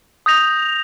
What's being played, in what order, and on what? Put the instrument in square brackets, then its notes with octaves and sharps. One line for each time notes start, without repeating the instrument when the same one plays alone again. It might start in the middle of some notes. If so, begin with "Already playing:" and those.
[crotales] D#6 G6 A#6 F7